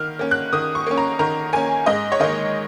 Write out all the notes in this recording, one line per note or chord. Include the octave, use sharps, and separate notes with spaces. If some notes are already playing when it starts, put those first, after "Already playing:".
Already playing: D#3 A#3 F6
A#3 C#4
F#6
D#3 D#6
C#6
A#3 C#4
A#5
D#3 A#5
A#3 C#4 G#5
G#2 D#5
C#5
D#3 A#3 D#5